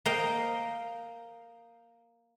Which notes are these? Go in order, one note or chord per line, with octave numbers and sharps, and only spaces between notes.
A#3 A#4 D#5 F5 G5